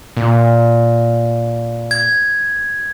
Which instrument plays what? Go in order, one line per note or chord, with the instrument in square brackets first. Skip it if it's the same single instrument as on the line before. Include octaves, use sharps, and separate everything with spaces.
[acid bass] A#2
[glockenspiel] G#6